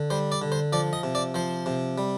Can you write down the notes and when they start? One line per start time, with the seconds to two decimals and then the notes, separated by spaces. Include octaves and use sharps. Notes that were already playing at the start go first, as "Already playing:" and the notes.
Already playing: D3
0.10 G3 C5
0.32 D5
0.42 D3
0.52 C5
0.73 F3 D5
0.93 D#5
1.03 C3
1.15 D5
1.34 F3 C5
1.66 C3
1.98 G3